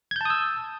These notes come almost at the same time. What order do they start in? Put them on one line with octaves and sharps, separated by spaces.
G#6 G6 A5 D#6 E6